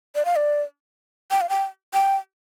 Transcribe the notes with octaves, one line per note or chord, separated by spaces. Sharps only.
D5
F5
D5
G5
F5
G5
G5